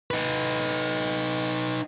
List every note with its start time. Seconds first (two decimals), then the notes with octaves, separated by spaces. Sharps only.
0.11 D#4 B4